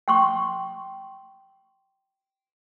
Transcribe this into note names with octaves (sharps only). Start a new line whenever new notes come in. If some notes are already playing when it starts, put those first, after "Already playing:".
G5 C6 C#6